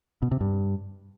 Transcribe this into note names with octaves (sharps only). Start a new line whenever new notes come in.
B2
C3
G2